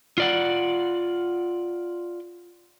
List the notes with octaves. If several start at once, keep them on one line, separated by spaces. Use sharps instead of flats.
F4 D5 F#5